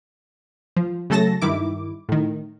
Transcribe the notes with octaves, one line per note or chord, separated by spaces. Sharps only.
F3
C#3 F#3 A3 A4 A5 A#6
G2 D#3 E4 D6
A2 D#3